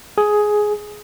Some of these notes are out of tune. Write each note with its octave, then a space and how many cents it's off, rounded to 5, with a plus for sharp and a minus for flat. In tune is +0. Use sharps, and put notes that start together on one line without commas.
G#4 +10